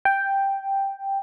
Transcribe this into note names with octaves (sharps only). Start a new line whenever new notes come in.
G5